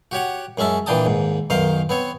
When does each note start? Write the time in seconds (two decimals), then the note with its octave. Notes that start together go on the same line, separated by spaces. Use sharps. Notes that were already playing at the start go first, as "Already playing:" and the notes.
0.11 F#4 G4 C#5 F#5
0.58 F#2 G#3 C#4 E5 A5
0.86 A#2 E3 D4 G5 A5 D#6
1.05 D#2 G#2
1.50 B1 F#2 D#3 C5 F5
1.89 B3 C4 C#5